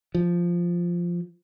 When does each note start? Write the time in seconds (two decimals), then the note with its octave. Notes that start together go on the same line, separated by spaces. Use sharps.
0.15 F3